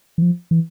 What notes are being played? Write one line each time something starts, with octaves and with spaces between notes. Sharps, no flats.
E3
F3
E3